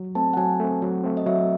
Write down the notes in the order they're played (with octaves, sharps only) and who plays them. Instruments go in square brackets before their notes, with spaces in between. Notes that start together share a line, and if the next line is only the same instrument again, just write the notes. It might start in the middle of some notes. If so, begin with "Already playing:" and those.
Already playing: [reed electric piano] F#3
[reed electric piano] A3 C4 [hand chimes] A5
[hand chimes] F#5
[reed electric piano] F#3 [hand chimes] G#5
[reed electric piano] A3 C4
[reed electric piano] F#3 [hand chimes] F#5
[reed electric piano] A3 C4
[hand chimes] D#5
[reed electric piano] F#3 [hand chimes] E5